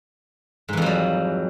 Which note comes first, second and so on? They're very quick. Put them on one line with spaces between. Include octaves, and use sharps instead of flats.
G#2 E3 F2 F#3 G3